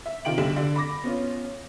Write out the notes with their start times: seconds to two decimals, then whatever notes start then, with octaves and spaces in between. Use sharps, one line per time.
0.06 E5
0.25 C3 D#3 F4 G5 D7 F#7
0.38 B1 D3 G3 E7
0.56 D3
0.76 B5 D6 A#6
1.03 B3 C#4 F4